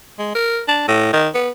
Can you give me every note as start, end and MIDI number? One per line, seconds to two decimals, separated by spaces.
0.19 0.30 56
0.35 0.61 70
0.68 0.86 62
0.88 1.09 45
1.13 1.29 51
1.34 1.50 59